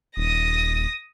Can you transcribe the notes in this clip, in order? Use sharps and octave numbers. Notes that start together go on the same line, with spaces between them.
D#1 D#6 A#6